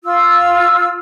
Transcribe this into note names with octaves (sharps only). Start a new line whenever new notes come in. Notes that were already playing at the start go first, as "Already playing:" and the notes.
F4 E6